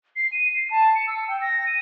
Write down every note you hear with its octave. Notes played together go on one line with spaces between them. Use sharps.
C7
D#7
C7
A5
C#7
E6
G5
A#6
D#7